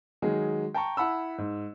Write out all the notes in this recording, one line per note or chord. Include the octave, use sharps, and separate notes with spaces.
D#3 F#3 G#3 G#4
G5 A5 A#5 C#6
E4 F#5 A5 B5 E6
G#2